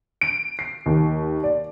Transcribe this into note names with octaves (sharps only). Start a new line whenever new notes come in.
D7
C7
D#2
D5